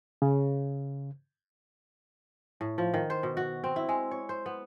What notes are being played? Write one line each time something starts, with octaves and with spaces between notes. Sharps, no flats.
C#3
A2
F3
D#3
C5
B2
F#4
C4
E4
G#3
C#5
C5
B3